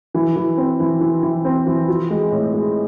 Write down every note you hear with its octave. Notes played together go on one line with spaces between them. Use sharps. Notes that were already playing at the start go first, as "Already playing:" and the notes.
E3
E3
C4
E3
E3
E3
C4
E3
F3
G#3
A2
G#3